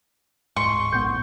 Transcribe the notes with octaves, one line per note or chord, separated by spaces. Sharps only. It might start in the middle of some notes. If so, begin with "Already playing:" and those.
D1 G#2 C6 C#6
A#1 A2 B3 G6